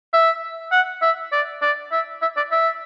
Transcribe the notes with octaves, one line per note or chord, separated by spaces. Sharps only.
E5
F#5
E5
D5
D5
E5
E5
D5
E5